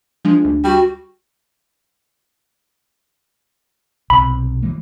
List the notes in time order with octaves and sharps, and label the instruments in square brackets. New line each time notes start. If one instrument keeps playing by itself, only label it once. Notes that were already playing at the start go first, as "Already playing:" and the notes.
[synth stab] F3 G#3 [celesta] D4
[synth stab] D2
[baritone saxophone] G3 [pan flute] F#4
[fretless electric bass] B1 C3 [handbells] B5
[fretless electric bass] E3 G#3 A#3